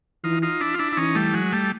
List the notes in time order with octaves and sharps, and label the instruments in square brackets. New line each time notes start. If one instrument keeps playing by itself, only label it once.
[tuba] E3 [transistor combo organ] D#4 F4
[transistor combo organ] D#4 F4
D4 E4
F4
D4 E4
E4
[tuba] E3 [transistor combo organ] C#4 D#4
[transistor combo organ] G3 A3
F#3 G#3
G3 A3